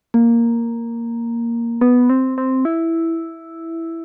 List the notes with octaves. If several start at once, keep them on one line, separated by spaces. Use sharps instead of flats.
A#3
B3
C4
C4
E4